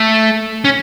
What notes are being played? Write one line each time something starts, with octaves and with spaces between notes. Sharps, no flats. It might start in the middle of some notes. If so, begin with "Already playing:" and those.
Already playing: A3
C#4